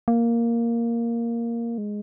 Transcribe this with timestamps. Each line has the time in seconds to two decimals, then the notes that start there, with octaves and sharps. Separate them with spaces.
0.08 A#3
1.78 G#3